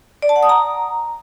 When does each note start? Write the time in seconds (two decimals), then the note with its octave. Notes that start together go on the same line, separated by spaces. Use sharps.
0.22 D5
0.29 A5
0.36 F#5
0.43 D#6
0.49 A#5